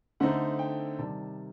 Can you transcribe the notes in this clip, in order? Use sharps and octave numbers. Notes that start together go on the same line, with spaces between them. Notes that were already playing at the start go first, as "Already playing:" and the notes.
D3 A3 C4 D#4 F#5
G5
C3 D#3 G3 A5